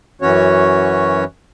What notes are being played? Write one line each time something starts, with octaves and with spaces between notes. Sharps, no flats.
F#2 E3 C#4 F#4 C#5